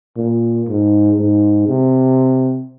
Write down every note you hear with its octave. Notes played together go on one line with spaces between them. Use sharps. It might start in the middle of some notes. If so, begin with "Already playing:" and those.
A#2
G#2
G#2
C3